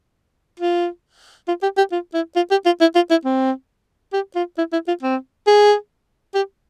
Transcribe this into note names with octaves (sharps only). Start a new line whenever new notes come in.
F4
F4
G4
G4
F4
E4
F4
G4
F4
E4
F4
E4
C4
G4
F4
E4
E4
F4
C4
G#4
G4